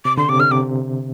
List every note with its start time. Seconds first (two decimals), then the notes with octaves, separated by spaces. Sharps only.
0.05 C3 D6
0.17 D3 C6
0.29 C3 D6
0.39 D3 F6
0.51 C3 D6